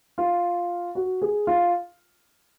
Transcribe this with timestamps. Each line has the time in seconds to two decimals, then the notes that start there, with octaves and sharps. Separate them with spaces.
0.18 F4
0.95 F#4
1.22 G#4
1.47 F4